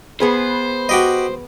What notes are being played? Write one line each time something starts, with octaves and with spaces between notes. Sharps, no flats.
B3 G#4 B4 C5
F#4 G4 D#5